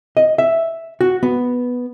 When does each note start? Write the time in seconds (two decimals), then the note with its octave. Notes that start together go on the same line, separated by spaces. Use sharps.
0.17 D#5
0.38 E5
1.01 F#4
1.23 B3